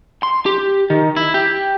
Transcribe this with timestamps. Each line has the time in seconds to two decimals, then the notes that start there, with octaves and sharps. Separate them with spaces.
0.23 C6
0.46 G4
0.90 D#3
1.16 E4
1.34 G4